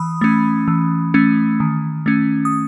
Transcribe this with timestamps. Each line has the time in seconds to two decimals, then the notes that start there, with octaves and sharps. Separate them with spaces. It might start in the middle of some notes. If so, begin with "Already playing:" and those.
Already playing: E3 B5 D#6
0.21 A3 C#4
0.68 E3
1.14 A3 C#4
1.60 D#3
2.06 A3 C#4
2.45 D#6